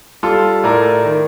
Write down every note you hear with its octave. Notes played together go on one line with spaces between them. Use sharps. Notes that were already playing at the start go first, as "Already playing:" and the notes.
G3 F4 A4
A2 A#4 D5
D#3